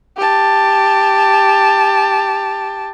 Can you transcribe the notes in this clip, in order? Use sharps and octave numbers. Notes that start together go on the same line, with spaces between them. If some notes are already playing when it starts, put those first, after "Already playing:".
G4 A5